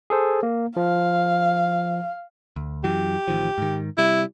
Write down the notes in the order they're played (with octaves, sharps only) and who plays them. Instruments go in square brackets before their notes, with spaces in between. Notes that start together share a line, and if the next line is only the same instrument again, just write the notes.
[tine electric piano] G#4 A4 C5
A#3
[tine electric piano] F3 [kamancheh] F5
[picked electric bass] D2
[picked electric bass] F#2 E3 F#3 [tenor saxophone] G4
[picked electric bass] A1 D#3 F3
G#2 D#3
[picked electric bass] C3 G3 [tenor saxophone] E4